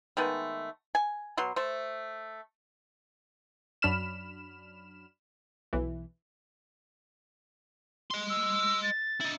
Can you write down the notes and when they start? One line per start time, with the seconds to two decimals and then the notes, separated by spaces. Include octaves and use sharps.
0.17 D#3 G#3 A3 B3
0.95 G#5
1.37 B2 F#3 C6
1.56 A3 C5
3.82 F#2 F#3 D4 B5 F6 E7
5.73 B1 E3
8.11 D#5 C6
8.30 E6
8.83 A6
9.21 E4 D#5